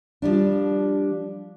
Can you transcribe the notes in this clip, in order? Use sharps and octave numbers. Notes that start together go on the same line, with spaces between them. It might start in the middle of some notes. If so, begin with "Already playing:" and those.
F3 G3 D4